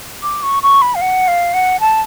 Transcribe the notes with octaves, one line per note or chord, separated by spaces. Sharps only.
D6
C#6
C#6
B5
F5
F#5
F5
F#5
A5